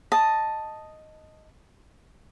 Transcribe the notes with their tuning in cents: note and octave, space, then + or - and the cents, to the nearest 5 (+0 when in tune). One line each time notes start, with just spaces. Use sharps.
D#5 +0 A5 +0 D#6 +0